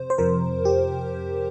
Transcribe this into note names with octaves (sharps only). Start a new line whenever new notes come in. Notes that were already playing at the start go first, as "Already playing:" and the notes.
Already playing: F2 C3 C5
C5
F2 C3 F3 A#4
G4